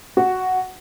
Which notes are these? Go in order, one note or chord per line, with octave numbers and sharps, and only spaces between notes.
F#4